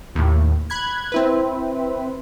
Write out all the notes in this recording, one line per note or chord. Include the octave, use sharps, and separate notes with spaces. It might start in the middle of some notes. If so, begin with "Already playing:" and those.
D#2 A2
B5 F#6 G#6
C4 E4 B4